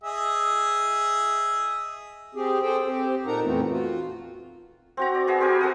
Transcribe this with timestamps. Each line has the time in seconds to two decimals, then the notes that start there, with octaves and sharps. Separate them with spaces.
0.03 G#4 D#5 E5
2.35 C4 G4 G#4
2.63 G#4 A4 C5 G5
2.86 C4 G4
3.26 A#2 D#4 A4 A#4 F#5 A#5
3.43 F2 A#2 E3 A3 B3 C4
3.71 F4 F#4
4.97 C4 F#4 A#5
5.15 D5
5.27 B3 F#4 G#4 E5
5.40 C4 G4 A#4 G#5
5.61 F#4 A4 F#5 D#6